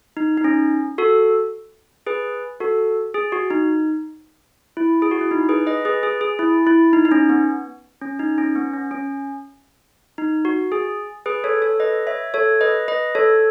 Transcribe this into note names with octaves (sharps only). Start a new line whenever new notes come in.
D#4
D#4
C#4
F#4 A4
G#4 B4
F#4 A4
G#4
F#4
D#4
E4
G#4
F#4
E4
D#4
G#4 B4
B4 D#5
G#4 B4
G#4
G#4
E4
E4
D#4
D#4
C#4
B3
C#4
D#4
C#4
B3
C#4
C#4
D#4
F#4
G#4
G#4 B4
A4 C#5
A4 C#5
B4 D#5
C#5 E5
A4 C#5
B4 D#5
B4 D#5
A4 C#5